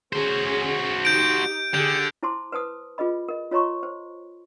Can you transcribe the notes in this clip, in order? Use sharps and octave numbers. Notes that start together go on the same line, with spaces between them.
C#4 F#4 G#4 C5
D#4 G4 G6 D7
D3 G4 G#4 G6
E4 C5 A5 C6 D6
B4 C5 A5 D#6
F4 G#4 B4 D#5 B5
A#4 D#5
F4 C#5 D#5 A#5 C6 C#6
C5